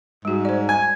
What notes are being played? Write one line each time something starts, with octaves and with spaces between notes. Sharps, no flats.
G#2 G3 F#4
C5 D5
G#5